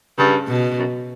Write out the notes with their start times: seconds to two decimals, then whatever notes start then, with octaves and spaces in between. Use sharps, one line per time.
0.18 G2 C#3
0.48 B2
0.79 F#2